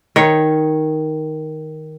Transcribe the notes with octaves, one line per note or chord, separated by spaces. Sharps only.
D#3 C#5